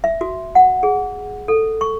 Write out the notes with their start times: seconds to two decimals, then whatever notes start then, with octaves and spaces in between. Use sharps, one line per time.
0.04 E5
0.21 F#4
0.55 F#5
0.83 G#4
1.48 A4
1.81 C#6